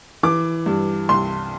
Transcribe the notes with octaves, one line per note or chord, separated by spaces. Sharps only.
E3 D6
G2
C2 C6